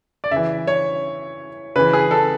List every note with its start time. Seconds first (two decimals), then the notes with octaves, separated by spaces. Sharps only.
0.24 D5
0.31 C#3 E3 E5
0.67 C#5
1.75 C#3 E3 B4
1.93 G#4
2.11 A4